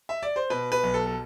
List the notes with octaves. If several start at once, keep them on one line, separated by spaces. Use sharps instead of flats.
E5
D5
C5
B2 B4
B4
B1
A4
A4